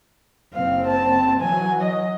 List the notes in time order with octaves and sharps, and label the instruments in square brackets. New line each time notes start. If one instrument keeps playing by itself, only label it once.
[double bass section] F#1 C4 [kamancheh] F5
[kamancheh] A5
[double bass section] E3 F#3 [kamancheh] G#5
[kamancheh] D#5